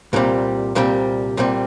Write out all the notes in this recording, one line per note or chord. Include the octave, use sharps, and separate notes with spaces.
C2 A#2 G3 C4
C2 A#2 G3 C4
C2 A#2 G3 C4